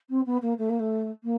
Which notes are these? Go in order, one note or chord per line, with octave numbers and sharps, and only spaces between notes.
C4
B3
A#3
A3
A#3
A3
A#3